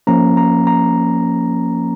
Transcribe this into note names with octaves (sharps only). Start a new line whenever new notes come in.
F3 A#3 C#4 A#5
A#5
A#5